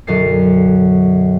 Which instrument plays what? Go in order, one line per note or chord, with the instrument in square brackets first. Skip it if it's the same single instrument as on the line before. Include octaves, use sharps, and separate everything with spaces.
[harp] B1 F#2 D3 A6 C7